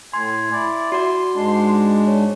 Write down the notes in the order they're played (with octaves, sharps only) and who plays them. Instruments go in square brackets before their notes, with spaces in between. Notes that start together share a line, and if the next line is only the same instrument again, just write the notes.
[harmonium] A2 [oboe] G#5 [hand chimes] C6
[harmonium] E4 [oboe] D5
[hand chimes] F#4 D5 [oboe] C6
[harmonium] G#2 G#3 D4
[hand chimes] C#5